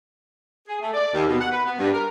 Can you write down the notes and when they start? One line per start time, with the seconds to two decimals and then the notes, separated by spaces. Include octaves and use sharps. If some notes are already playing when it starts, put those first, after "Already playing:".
0.68 G#4
0.81 A3
0.93 D5
1.14 D#2
1.28 B2
1.41 F#5
1.52 B4
1.65 B3
1.79 G2
1.94 A#4